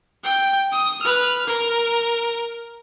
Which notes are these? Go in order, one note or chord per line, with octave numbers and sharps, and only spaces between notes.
G5
D#6
B4 F6
A#4